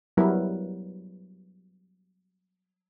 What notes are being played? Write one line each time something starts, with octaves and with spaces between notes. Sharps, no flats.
F#3 G3 B3 E4 A#4 B4